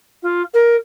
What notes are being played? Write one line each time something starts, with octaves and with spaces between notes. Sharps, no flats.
F4
A#4